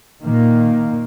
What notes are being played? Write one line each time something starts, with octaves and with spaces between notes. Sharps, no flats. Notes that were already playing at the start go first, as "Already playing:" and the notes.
A#2 D#3 A#3